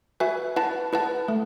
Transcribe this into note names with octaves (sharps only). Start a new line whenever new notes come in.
F#4 B4 E5 G#5
E4 B4 F#5 A5
E4 B4 F#5 A5
A3